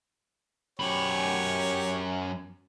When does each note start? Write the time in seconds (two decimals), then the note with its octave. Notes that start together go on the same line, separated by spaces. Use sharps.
0.80 F#2 G4 C#5 B5